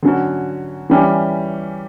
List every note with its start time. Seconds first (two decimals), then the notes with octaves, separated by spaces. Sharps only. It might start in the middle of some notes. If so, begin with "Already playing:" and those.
0.03 D3 F#3 C#4 F#4
0.90 E3 G3 C#4 G4